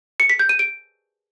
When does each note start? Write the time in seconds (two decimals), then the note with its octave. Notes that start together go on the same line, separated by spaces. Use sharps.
0.20 C#7
0.30 B6
0.39 G6
0.49 D#7
0.59 D7